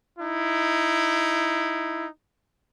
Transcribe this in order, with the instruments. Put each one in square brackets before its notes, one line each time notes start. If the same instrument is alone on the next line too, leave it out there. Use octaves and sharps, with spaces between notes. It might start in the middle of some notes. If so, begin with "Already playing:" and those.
[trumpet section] D#4 E4